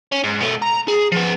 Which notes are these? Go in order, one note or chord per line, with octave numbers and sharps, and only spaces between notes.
C#4
G#2
B2 A3
A#5
G#4
F3 B3